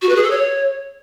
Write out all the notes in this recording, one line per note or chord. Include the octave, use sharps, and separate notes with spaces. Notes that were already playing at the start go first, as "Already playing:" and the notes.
F#4
B4
G#4
A4
C#5